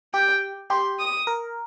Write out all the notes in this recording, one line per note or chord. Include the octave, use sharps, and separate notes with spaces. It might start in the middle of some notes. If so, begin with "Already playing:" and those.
G4 G5
G4 C6
D#6
A#4